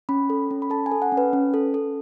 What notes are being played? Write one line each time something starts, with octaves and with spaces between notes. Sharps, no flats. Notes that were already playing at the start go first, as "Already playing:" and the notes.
C#4 B5
A4
C#4
B5
A4 A5
G#5
A4
F#5
C#4
B4
C#4
A4
A4